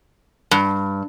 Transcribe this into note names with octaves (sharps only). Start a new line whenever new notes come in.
G2